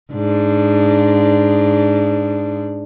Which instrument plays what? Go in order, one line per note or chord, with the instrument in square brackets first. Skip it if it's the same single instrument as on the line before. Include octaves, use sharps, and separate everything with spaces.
[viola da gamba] G#2 D4